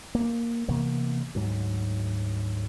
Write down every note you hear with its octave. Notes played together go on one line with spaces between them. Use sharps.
A#3
C3 E3 A#3 B3
D2 G#2 F#3